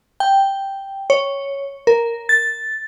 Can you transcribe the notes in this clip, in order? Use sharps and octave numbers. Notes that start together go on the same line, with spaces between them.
G5
C#5
A#4
A6